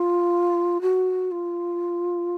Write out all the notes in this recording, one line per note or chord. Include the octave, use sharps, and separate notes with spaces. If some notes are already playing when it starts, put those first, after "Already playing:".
Already playing: F4
F#4
F4